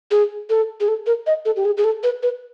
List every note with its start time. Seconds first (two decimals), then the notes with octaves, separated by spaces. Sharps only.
0.11 G#4
0.50 A4
0.80 G#4
0.88 A4
1.07 A#4
1.27 D#5
1.45 A4
1.56 G4
1.65 G#4
1.77 G#4
1.84 A4
2.03 B4
2.23 B4